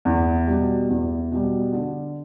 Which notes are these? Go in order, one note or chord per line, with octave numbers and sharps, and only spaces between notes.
E2
B2 G3
E2
B2 G3
D3